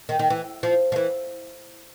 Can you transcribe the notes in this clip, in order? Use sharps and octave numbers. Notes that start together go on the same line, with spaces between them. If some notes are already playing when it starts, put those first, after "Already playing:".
D#3
D#3
E3
F3
F3
E3